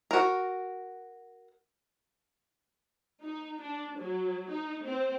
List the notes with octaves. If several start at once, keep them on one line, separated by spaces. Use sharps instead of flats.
F#4 A#4
D#4
D4
F#3
D#4
C4